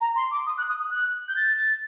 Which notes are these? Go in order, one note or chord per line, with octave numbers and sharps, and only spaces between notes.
A#5
C6
D6
D#6
F#6
D#6
D#6
F#6
G6
A6